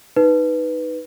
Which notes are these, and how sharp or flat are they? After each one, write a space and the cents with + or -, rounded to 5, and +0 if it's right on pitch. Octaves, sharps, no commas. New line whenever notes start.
D#4 +0 B4 +0